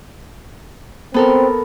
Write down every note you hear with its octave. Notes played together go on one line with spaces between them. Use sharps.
B3 C4 A4 A#4